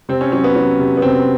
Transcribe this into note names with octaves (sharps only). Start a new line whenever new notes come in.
C3 C4
C#4
F#3 C#4
B3
F#3
C3
B3
C3 C4